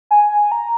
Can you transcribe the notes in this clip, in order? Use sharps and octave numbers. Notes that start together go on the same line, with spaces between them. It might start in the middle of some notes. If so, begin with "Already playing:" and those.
G#5
A#5